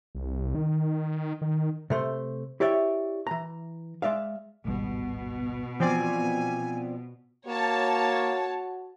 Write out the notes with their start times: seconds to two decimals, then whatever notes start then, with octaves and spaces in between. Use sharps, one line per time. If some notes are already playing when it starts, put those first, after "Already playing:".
0.15 C2
0.55 D#3
1.41 D#3
1.90 C3 A3 C5
2.60 E4 G4 C#5 D5 E5
3.27 E3 A#5
4.02 G#3 D5 E5 F5
4.65 D1 G#1 B2 G3
5.80 E3 F3 B3 C4 D5 G#5
7.47 A#3 F#4 C#5 A5